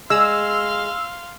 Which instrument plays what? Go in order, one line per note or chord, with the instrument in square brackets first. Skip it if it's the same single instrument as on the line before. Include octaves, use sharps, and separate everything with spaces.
[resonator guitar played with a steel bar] G#3 [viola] F5 C6 [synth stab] E6